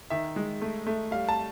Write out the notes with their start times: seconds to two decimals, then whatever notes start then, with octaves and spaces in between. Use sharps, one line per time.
0.10 D#3 E5
0.36 G#3
0.62 A3
0.87 A3
1.11 G3 F5
1.29 A5